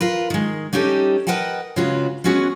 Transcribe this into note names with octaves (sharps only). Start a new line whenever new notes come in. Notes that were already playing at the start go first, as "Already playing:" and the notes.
F4 A#4 B4
D#3 G#3
G3 C#4 D#4 G4 A4
A#4 B4 D#5 F#5 G5 A5
C#3 G#3 F4 F#4 B4
G#3 B3 C#4 F#4 G#4